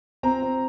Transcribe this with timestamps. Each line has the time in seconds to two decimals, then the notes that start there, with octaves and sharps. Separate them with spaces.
0.23 C4 A#5
0.42 C4